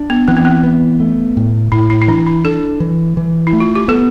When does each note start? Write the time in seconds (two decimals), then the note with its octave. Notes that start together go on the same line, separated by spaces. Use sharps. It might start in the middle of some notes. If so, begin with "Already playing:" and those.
Already playing: D4
0.10 B3
0.28 E3 C4
0.37 B3
0.45 C4
0.63 B3
1.00 A3
1.37 A2
1.72 A2 E4
1.90 E4
2.02 E4
2.08 E3 D4
2.26 E4
2.45 D4 A4
2.80 E3
3.17 E3
3.47 E4
3.53 A3
3.60 F4
3.75 G4
3.88 B3 A4